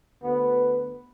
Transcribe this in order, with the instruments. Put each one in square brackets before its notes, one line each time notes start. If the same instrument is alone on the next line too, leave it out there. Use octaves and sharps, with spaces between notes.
[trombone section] D2 B3